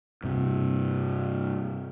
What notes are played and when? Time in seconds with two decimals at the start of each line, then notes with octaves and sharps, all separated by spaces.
0.24 G2 C3